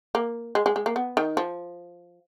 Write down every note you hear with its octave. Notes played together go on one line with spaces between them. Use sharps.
A#3
G#3
G#3
G#3
A#3
B3
D#3
F3